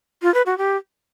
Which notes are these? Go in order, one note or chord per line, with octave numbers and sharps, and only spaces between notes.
F4
B4
F#4
G4